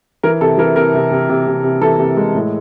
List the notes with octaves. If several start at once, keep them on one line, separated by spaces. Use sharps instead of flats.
E3 A#4
C3 A4
E3 A#4
C3 A#4
C3
C3
C3
C3
C3
E3 A4
C3
G#3
A2